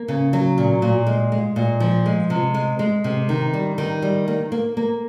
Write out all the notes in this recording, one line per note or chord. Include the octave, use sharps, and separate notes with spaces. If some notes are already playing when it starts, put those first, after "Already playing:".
Already playing: A#3
C#3
F#3
A#2
A#2
G#3
G#3
A#2
F3
G#3
C3
G#3
G#3
C3
D#3
G3
D#3
G3
A#3
A#3
A#3